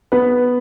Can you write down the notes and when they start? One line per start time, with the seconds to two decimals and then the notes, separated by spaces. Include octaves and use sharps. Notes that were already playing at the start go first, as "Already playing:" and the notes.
0.12 B3 B4